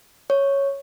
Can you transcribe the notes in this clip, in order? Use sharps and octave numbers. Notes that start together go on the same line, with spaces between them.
C#5